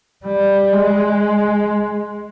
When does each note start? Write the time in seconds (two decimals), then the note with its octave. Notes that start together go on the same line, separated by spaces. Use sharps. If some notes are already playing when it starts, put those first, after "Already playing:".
0.25 G3
0.73 G#3